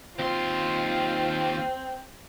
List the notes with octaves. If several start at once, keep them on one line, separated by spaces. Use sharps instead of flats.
D#2 C4 F4 C6